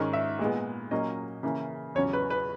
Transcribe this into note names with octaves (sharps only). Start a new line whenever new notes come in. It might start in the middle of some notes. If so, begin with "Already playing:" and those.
Already playing: G#2 D#3 G#3 C#4
E5
A#2 G#3 B3
A#2 F#3 A#3 C#4 D#5
C#3 E3 A#3 C#4
E2 C#3 F#3 C#4 C#5
B4
B4